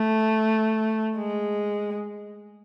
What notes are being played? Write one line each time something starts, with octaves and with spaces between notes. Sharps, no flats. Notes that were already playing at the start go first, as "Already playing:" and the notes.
Already playing: A3
G#3